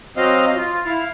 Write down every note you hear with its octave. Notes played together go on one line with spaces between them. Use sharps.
F#3 C4 D#5 F5
F4
E4 F5